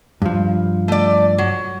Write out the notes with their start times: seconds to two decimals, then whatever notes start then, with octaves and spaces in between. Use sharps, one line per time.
0.22 G2 F3
0.88 A3 D5
1.38 F#3